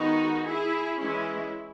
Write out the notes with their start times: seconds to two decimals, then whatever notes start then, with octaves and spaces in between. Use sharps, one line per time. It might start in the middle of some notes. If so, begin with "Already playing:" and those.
Already playing: D#3 G#3 B3 D#4 F#4
0.45 E4 G#4
0.99 E3 G#3 C#4 E4